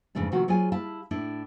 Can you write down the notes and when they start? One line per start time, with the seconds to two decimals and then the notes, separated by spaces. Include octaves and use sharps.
0.15 F2 G#2 C#3 E3 A3 D4
0.32 C3 D#3 F3 A3 F#4
0.48 F#3 F4 G#4 C5 D5 G#5
0.72 G3 E4 F5 A5
1.11 A2 D4 E4 A4